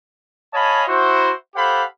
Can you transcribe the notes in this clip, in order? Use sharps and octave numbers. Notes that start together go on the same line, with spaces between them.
C#5 D#5 F5 G#5 A5 B5
E4 F#4 C5
G4 A4 C5 F5 F#5 B5